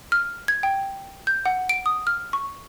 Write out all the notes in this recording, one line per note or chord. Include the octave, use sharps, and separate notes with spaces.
F6
G#6
G5
G6
F#5
D7
D#6
F6
C#6